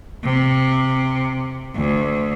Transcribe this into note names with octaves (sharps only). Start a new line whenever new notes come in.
C3
D2